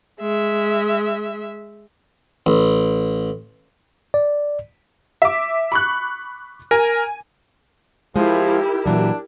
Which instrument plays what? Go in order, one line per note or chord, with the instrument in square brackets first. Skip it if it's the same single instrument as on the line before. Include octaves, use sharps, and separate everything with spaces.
[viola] G#3 E5
[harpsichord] A1
[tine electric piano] D5
[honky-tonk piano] E5 D6
B5 C#6 F#6
[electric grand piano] A#4 [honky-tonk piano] G#5
[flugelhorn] F3 [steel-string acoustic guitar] G#3 [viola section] E4 G4 A#4
[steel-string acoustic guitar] A#2 E3 F#3 [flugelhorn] D4